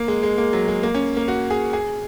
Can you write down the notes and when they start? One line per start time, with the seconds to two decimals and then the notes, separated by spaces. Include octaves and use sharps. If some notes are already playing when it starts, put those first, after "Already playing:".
Already playing: A#3
0.08 G#3
0.23 G#3
0.38 A#3
0.53 F#3
0.68 G#3
0.83 A#3
0.94 C#4
1.17 A#3
1.28 F#4
1.50 G#4
1.73 G#4